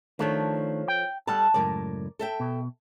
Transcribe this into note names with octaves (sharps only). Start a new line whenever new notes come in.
D#3 F3 A3 D4 A4 C#5
G5
G3 A4 F#5 A5
C#2 F#2 A2 A#4 D5
A4 E5 G5
B2